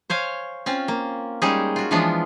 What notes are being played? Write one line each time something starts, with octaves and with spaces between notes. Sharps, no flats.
C5 C#5 F5 G#5
C4 C#4 F4
A#3
G3 G#3 C#4 D#4 G#4
F4 F#4
E3 F3 G#3 B3 D4 F4